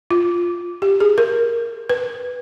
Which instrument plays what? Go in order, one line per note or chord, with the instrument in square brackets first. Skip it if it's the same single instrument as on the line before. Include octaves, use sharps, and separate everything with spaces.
[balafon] F4
G4
G#4
A#4
B4